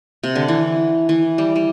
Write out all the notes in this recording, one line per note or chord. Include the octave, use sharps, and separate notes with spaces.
C3
D3
E3
E3
G3
G3